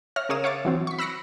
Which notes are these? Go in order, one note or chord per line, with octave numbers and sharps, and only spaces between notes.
C#5 E5 F6 A#6
C#3 A#4 C#5 F5 D#6 E7
C#5 E5 F5 C#6 D6 A6
E3 F#3 C4
C#6 B6
B5 E6 F#6 A#6 B6 C#7